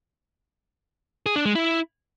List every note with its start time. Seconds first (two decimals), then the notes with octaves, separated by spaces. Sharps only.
1.26 G#4
1.36 D4
1.46 G#3
1.55 E4